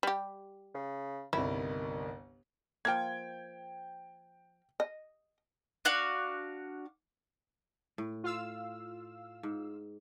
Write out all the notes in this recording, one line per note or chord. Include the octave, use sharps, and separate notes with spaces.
G3 G4
C#3
G1 C2 D#3 E4
F3 A#3 G5 G#6
D#5
D4 F#4 F5
A2
F4 F5 E6
G#2